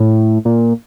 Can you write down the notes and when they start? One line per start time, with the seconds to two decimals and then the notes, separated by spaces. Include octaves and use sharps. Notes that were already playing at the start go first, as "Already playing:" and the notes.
Already playing: A2
0.45 A#2